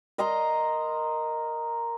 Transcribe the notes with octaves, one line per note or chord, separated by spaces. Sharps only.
A#4 D#5 A#5 C6